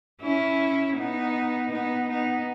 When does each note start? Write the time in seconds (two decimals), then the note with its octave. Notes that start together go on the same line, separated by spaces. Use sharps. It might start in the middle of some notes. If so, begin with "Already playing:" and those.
0.21 C#4 E4
0.97 B3 D#4
1.71 B3 D#4
2.09 B3 D#4